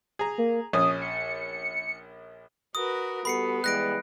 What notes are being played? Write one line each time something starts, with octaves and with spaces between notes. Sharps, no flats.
G#4 A#5
A#3
A#1 C#4 D#6
C#7
F#4 A#4 B4 D#6
G3 B3 F#4 A4 B5 C7 C#7
E3 G3 G#3 F#6 A#6 D7